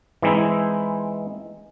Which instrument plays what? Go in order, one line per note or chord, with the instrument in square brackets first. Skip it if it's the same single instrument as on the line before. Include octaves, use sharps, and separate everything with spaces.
[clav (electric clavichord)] E3 G#3 C4 D#4 E4